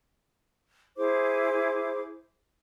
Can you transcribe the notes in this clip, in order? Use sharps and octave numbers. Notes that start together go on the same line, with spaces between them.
E4 G#4 C5 D6